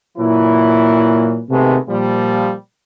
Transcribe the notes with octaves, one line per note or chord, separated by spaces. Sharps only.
A#2 E3 F#3 E4
C3 D#3 G#3 A3 B3
A#2 F3 G3